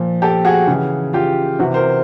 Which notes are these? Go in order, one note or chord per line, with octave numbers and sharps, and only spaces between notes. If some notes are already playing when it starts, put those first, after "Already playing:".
Already playing: A#2 F3
G4 A4
F#4 G#4
C#3 E3
F4 G4
C3 E3 F#4
A#4 C5